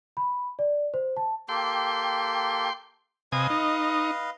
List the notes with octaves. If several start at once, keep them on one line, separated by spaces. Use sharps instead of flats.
B5
D5
C5
A5
A#3 G4 A4 G5 C6
C3 B4 D#5 F5 G#5 D#6
D#4